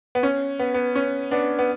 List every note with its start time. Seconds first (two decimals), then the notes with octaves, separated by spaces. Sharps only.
0.15 B3
0.23 C#4
0.59 B3
0.74 B3
0.96 C#4
1.31 B3 D4
1.59 B3